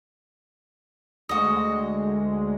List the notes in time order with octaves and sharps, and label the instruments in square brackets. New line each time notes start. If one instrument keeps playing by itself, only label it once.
[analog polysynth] D2 G#3 [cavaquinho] F#4 D#5